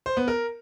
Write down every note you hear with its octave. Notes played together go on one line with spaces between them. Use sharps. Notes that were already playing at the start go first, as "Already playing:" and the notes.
C5
B3
A#4